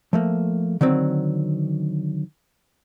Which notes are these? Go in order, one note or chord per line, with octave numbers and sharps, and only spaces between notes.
F3 A3 A#3
D3 D#3 F#3 C4